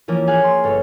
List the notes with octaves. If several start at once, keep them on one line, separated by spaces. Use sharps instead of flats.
E3 F3 A#3 C#4
G#4 F5 G#5 F#6
C6
G1 A4 C#5